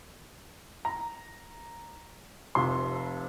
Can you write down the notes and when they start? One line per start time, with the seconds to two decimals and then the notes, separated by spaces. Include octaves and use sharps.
0.85 A#5
2.55 F1 F2 C3 C6